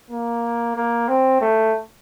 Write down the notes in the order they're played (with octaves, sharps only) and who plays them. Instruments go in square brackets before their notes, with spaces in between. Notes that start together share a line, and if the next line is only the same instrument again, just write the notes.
[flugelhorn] A#3
A#3
C4
A3